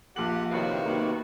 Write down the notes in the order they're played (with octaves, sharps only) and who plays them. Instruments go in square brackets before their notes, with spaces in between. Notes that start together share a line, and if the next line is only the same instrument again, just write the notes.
[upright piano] A#1 A#3 F#7 [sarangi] F4 [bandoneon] G4 F#5
[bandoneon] C3 D#3 B3 [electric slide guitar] E4 C#5 F5 [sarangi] F#4
[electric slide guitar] F#3 D#4 B4 [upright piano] A#3